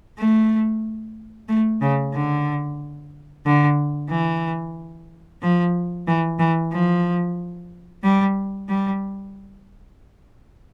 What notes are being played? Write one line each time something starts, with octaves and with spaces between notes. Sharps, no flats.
A3
A3
C#3
D3
D3
E3
F3
E3
E3
F3
G3
G3